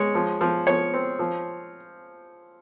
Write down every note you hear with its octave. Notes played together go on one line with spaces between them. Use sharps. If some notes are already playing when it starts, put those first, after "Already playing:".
Already playing: G#3 C#5
F3
F3
F3 C#5
C4
F3